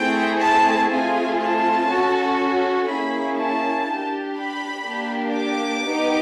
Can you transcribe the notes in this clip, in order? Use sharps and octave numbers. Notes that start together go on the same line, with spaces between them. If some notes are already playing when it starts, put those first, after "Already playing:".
Already playing: A3 C4 E4 G#4 G5
A5
A3 C4 F4 G#4 G#5
A5
C#4 F#4 A4
A#3 C#4 E4 G#4 B5
A5
D4 G4
B5
A#3 D4 G4
D6
B3 D#4 G4